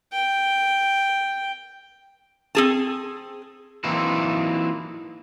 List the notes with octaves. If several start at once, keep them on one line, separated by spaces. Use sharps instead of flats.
G5
C4 G#4 A5
E3 F#3 A#3 C4 D#4 E4